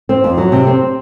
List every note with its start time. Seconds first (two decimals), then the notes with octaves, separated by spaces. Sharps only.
0.09 C4
0.24 F2
0.38 F#3
0.52 C3
0.67 C4